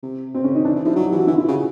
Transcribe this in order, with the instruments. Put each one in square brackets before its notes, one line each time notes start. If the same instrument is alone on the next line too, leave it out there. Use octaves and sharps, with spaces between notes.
[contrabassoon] C3
[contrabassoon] B2 [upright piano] C4
[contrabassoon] C#3 [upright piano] C#4
[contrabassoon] D#3 [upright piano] D#4
[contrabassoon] E3 [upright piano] D4
[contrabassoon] E3
[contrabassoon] F3 [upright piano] E4
[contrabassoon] F#3 [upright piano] D#4
[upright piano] G4
[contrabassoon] E3 [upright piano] F#4
[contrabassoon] E3 [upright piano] E4
[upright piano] F4
E4
[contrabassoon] C#3 [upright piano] F#4